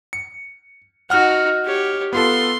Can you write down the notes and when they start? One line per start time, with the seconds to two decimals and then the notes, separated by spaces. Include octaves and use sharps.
0.13 C#7
1.10 D#4 F#4 F#5 F6
1.65 G4 C#5
2.13 B3 F4 A4 C6